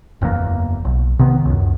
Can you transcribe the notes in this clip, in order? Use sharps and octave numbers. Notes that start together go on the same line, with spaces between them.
F#1 E2 A#2 A#3
B1
C3 D#3 B3
C#2 F#2